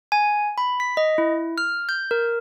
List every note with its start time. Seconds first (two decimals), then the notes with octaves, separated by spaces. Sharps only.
0.12 G#5
0.58 B5
0.80 B6
0.97 D#5
1.18 E4
1.58 F6
1.89 G6
2.11 A#4